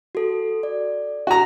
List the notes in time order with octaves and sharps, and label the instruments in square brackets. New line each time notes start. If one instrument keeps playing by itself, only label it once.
[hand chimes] F#4 A4
D5
[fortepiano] F#4 A#5